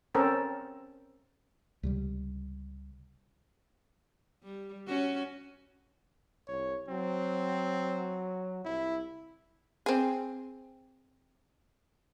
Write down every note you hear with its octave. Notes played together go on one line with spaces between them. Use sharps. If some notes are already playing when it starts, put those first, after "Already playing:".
C4 C#4 A4 A#4 C5
C#2 C3 G3
G3
C#4 F#4
C2 C#5
F#3 C4
C2 E4
C4 G#4